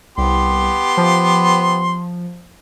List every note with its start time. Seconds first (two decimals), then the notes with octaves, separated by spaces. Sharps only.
0.18 C2 B3 G4 C6
0.97 F3